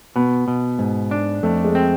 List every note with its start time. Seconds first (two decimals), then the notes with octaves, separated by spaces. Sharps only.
0.16 B2 B3
0.48 B2
0.79 G#2
1.11 D4
1.43 F2 A3
1.64 G#3
1.75 C4